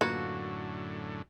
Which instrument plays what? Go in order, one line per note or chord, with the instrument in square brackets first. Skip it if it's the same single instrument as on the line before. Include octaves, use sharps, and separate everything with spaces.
[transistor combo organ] F#2 A2 D3 [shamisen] A#3 F4 B4 [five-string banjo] F#4